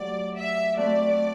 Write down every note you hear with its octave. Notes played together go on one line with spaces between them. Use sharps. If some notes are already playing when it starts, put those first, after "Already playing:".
Already playing: F#3 A3 G4 D5
E5
A3 C4 F#4 A4 C5 D5